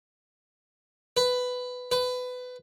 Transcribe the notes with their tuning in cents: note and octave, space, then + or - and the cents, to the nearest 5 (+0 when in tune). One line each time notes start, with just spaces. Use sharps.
B4 +10
B4 +20